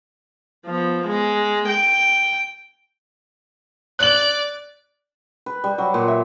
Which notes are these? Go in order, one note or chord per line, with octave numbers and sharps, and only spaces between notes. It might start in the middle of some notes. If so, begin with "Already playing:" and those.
F3 B3
G#3
G5
D5 F#6 F#7
B4
G3
F#3
A#2
E5